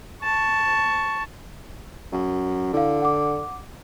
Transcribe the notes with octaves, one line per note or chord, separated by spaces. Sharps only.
A5 C#6
F#2
D3 E4 F5
F#5 D6